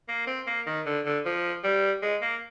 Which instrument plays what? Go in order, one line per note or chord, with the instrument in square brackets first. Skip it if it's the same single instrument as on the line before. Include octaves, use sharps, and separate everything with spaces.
[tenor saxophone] A#3
C4
A#3
D#3
D3
D3
F3
G3
G#3
A#3